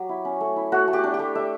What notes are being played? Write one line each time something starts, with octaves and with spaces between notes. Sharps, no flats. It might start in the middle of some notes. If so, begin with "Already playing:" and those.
Already playing: F#3 G4
E4
C#4
A3
E4
A3 F#4
A3
G4
D4
G4
A3
A3 E5